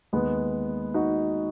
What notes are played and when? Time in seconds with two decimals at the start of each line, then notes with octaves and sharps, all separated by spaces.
0.12 D#2 D#3 G#3 B3
0.94 D#4 F#4